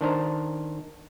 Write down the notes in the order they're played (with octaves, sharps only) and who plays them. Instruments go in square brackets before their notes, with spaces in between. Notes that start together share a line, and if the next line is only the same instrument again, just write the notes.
[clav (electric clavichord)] D#3 D4 C5 A#5